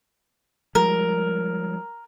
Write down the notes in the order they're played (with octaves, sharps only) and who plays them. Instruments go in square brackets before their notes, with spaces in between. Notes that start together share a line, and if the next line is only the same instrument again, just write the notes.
[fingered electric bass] F3 G3 G#3 [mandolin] A#4